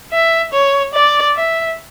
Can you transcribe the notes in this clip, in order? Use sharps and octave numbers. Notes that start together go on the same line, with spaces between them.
E5
C#5
D5
E5